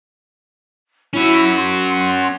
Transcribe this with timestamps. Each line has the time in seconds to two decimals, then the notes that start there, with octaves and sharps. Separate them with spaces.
1.13 C#4 E4 F#4
1.57 C6